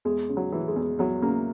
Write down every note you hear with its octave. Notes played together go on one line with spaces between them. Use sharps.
E2 G#3
C#3
F#3
E3
G#3
E2
E2 F#3
C#3 A#3